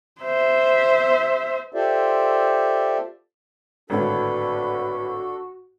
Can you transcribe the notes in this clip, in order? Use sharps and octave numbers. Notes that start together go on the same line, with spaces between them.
C5 E5
F4 G4 A4 C5 D5 E5
G#1 A2 D3 D4 F#4 A4 B4